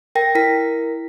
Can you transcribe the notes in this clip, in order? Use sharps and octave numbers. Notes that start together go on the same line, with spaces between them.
A#4 G5 A#6
E4 A#4 B6